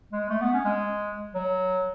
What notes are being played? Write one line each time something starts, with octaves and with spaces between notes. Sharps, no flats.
G#3
A3
B3
C#4
G#3
F#3